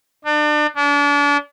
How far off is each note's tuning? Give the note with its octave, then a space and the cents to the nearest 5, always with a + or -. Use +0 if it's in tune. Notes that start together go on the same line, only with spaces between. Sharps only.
D4 +35
D4 -35